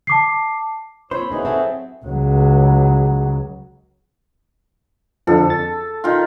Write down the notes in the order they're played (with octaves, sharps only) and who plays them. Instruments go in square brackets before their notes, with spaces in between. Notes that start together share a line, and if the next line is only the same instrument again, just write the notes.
[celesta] A5 D6 C7
[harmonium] A#2 C#5 [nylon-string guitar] C4 [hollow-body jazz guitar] C5 [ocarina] B5
[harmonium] E3 F#3 G#4 [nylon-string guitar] A#3 D#4
[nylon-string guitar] C4 A4 [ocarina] E5
[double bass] C#2 F#3
[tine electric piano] F2 D3 F3 [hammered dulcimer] A4
[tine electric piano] A6
[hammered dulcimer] D#3 F4